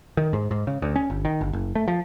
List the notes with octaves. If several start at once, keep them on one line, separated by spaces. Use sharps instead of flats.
D#3
G#2
G#2
C#3
D2
C#4
G1
D#3
G1
F#1
A3
F3